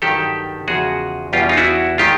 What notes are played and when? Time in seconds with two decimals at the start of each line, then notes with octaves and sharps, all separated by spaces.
0.02 G2 D#3 F#3 G4 A4
0.68 E2 C#3 F3 F#4 G#4
1.33 E2 B2 G3 F4 G4
1.49 D#4 F4
1.57 E4 F#4
1.98 D#3 G#3 F4 G4